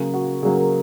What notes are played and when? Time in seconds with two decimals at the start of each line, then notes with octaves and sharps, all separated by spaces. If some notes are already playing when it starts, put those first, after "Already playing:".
Already playing: C#3 F#3 A#3 G#4
0.14 F#4
0.42 C#3 F#3 A#3 G#4
0.57 A#4